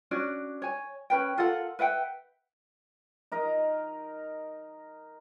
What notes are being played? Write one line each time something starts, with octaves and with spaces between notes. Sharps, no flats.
C#4 D4 F#4 D5
C#5 G#5
C#4 B4 G5
F4 A4 A#4 F#5
B4 E5 F#5 G5
D#4 A#4 D#5